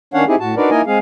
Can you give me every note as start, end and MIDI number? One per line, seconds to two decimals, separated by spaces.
0.14 0.24 51
0.14 0.24 61
0.14 0.24 62
0.14 0.24 73
0.14 0.24 77
0.14 0.24 78
0.28 0.35 60
0.28 0.35 63
0.28 0.35 64
0.28 0.35 67
0.28 0.35 68
0.40 0.55 45
0.40 0.55 66
0.40 0.55 81
0.56 0.70 62
0.56 0.70 63
0.56 0.70 66
0.56 0.70 70
0.56 0.70 71
0.56 0.70 74
0.71 0.81 58
0.71 0.81 63
0.71 0.81 64
0.71 0.81 70
0.71 0.81 75
0.71 0.81 80
0.86 0.99 56
0.86 0.99 60
0.86 0.99 68
0.86 0.99 77